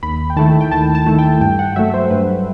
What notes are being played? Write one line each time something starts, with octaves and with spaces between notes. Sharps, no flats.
D#2 B5
G5
D#3 A3 E4 A5
G5
D#2 A5
A5
D#3 A3 E4
G5
G2 G5
F#5
F#3 A3 E5
C5
G2 B4